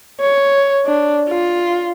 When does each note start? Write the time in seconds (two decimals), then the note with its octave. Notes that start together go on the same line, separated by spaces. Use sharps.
0.21 C#5
0.86 D4
1.29 F4